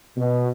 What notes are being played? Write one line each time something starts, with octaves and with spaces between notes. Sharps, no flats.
B2